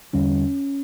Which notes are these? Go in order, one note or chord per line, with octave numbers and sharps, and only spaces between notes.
E2 D3 G3 C#4